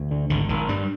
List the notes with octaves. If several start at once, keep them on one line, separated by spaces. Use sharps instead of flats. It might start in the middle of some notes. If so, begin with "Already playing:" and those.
Already playing: D2
D3
G#1 D3
G#1 D#3
G2 G3